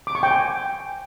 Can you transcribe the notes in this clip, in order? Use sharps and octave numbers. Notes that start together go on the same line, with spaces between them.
D6
C#6
G5
G#5